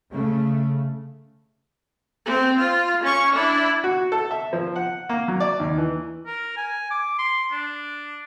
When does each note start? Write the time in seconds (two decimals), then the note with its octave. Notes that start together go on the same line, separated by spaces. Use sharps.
0.12 C#3 A3
2.26 C4
2.59 F4
3.04 C#4 C#6
3.32 D4 E4
3.84 F#4
4.12 A4
4.31 E5
4.53 F3
4.76 F#5
5.09 A#3
5.28 F#3
5.40 D5
5.60 D#2
5.78 E3
6.27 A#4
6.57 G#5
6.90 D6
7.19 C6
7.52 D4